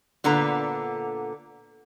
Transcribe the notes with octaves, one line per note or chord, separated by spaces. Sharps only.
A#2 D3 B3 A#5